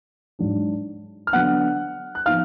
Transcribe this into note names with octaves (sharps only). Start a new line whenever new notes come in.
G#2 F#3 D4
F6
D3 F#3 B3 D4 F#5 F#6
F#6
F3 B3 D#4 F5 F6